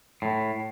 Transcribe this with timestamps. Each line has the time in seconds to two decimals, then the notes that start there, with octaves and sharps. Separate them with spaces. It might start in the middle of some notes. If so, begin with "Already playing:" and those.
0.22 A2